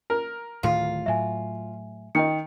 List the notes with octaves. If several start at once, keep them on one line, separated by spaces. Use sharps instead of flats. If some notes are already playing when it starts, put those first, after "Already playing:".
A#4
D1 A2 D#3 F4
A2 F#3 E5 G#5
D#3 D#5 G5 C#7